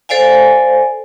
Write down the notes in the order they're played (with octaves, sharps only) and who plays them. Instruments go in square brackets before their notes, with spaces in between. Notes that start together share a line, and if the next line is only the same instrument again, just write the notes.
[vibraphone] A4 C5 D5 F5 G#5